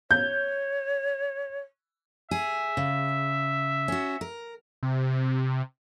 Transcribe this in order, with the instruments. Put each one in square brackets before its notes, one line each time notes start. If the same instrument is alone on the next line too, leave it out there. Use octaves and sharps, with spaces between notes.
[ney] C#5 [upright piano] G6
[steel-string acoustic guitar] G#4 [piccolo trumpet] E5
[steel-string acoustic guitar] C#3
C#4 F#4
A#4
[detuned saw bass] C3